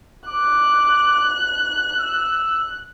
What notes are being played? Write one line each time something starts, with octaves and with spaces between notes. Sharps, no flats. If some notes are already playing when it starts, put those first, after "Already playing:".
D6 F#6
E6